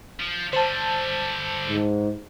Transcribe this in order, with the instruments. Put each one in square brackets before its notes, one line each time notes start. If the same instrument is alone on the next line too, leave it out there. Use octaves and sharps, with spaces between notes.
[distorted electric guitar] F3
[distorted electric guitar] D3 G3 [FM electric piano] C5 A5
[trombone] G#2